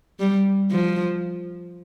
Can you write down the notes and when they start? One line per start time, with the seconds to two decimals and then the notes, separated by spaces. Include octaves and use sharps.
0.19 G3
0.71 F3